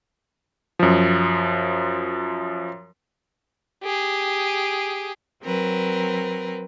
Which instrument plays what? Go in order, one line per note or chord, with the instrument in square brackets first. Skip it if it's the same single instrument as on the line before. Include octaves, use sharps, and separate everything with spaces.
[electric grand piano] F#2 F3
[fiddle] G4 G#4
[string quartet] F#3 C4 A#4 B4